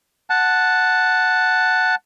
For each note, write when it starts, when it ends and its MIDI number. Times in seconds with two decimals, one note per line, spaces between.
0.30 1.95 78
0.30 1.95 81